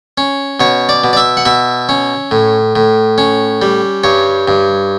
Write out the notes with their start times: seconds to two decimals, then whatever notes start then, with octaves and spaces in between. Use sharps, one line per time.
0.18 C#4
0.60 B2 C#5
0.89 D5
1.04 B2
1.13 D5
1.17 E5
1.37 F#5
1.45 B2 E5
1.89 C#4
2.31 A2
2.76 A2
3.18 C#4
3.62 G3
4.04 G2 C#5
4.48 G2